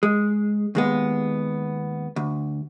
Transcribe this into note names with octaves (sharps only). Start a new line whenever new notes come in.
G#3
D#2 G#3 B3
D2